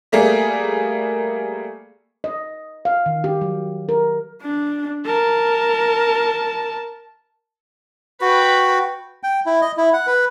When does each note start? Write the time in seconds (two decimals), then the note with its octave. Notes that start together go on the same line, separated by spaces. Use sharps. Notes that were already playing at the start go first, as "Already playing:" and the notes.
0.12 G3 A3 A#3 G#4
2.24 D#5
2.85 F5
3.06 D#3
3.24 G4
3.41 F#3
3.89 A#4
4.42 D4
5.06 A#4 A5
8.21 F#4 B4 G5
9.23 G5
9.46 E4
9.61 D#5
9.77 E4
9.93 F#5
10.07 B4